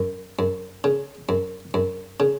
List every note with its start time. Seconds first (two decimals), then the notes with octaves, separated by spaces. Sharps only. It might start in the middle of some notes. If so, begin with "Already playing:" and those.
Already playing: F#2
0.39 F#2
0.84 C#3
1.29 F#2
1.74 F#2
2.20 C#3